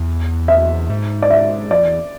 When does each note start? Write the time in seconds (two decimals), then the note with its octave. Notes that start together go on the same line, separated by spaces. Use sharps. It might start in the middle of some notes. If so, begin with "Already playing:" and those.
Already playing: E2
0.48 E5
0.90 G#2
1.22 D5
1.30 E5
1.71 F2 D5
1.85 E2